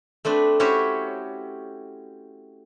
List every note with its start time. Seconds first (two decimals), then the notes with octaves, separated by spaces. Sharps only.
0.25 A3 C4 D4 B4
0.60 C#4 E4 F#4 G4 C5 C#5